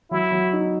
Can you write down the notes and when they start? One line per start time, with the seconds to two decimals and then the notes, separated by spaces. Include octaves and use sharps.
0.10 F#3 E4
0.32 F#3
0.53 D#4